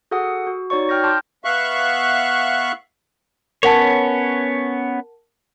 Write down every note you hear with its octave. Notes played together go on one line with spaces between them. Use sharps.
F#4 G#4 A4 F#5 D#6
F#4
D#4 F#4 C#5 D5 C#6
G5 F6 G6 A#6
A5 C6 D6 F6 G6
B3 E5 F5 C#6 F#6
B3 C#4 A#4 C#5 F#5 A5